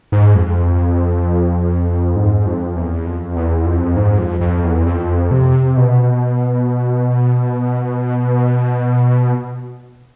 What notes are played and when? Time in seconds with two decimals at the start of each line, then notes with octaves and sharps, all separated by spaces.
0.12 G#2
0.35 F2
2.16 G#2
2.46 F2
2.76 E2
3.06 F2
3.36 E2
3.66 F2
3.96 G#2
4.19 F2
4.41 F2
4.64 E2
4.86 F2
5.31 C3
5.77 B2